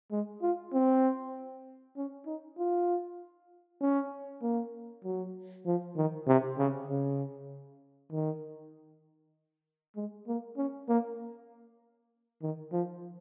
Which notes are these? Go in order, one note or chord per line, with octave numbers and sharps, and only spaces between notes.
G#3
F4
C4
C#4
D#4
F4
C#4
A#3
F#3
F3
D#3
C3
C#3
C#3
D#3
G#3
A#3
C#4
A#3
D#3
F3